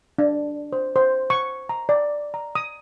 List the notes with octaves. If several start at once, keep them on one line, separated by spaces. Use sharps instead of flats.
D4
C5
C5
C#6
A#5
D5
A#5
D#6